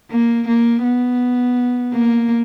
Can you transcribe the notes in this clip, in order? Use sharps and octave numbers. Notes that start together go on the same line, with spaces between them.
A#3
A#3
B3
A#3